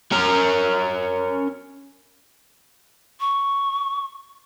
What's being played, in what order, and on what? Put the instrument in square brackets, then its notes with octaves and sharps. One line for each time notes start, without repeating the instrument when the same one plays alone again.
[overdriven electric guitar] C#4 A#4
[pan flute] C#6